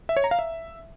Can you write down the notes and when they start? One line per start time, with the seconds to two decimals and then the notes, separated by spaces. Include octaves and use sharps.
0.09 E5
0.17 C#5
0.24 A#5
0.31 F5
0.39 E5